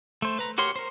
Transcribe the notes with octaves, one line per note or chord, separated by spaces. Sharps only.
A3 C5
B4 A#5
F#4 G4 A#4 C#5 C6
A#4 C5